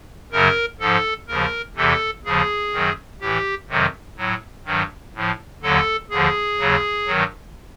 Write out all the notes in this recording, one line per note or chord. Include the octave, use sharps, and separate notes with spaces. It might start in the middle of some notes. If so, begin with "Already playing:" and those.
F#2 C#3 F#3 A#4
G#2 F3 A4
D#2 C#3 F3 A#4
E2 C3 E3 A4
D#2 C#3 F3 G#4
F#2 D#3 F#3
A2 E3 G4
F2 C3 D#3 F#3
A2 F#3
G2 D#3 F#3
A2 F3
D#2 D3 F#3 A4
D#2 D3 F3 G#4
D#2 C#3 F#3
G2 D#3 F#3